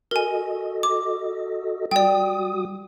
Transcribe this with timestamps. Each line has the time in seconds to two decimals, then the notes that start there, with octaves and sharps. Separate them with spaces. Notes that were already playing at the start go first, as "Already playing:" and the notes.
0.11 F#4 A4 A#4 D#5 G#5
0.83 D6
1.91 G3 F#4 D5 G5 D#6